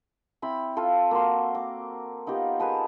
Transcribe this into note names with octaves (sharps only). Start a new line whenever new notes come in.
C4 E4 B5
F4 A4
A#3 F#4 C6
D6
B3 D#4 F4 G4
G#4 A#4 B4 A5